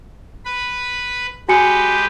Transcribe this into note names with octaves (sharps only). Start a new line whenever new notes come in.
B4 B5
G#3 F#4 G4 B4 G#5 C#7